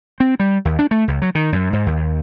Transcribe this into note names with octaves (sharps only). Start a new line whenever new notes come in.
C4
G3
D#2
D4
A3
C#2
F#3
D#3
F#2
G#2
D#2